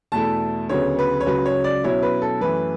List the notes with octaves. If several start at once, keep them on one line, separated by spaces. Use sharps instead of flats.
E2 B2 A3 E4 A5
D2 C#3 F#3 B3 C#5
B4
C#5
C#2 C#3 F#3 B4
C#5
D5
B2 F#3 C#4 E4 C#5
B4
A4
F#2 E3 A3 B4